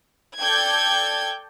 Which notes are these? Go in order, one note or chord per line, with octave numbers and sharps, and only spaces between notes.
A4 D5 G5 G6 G#6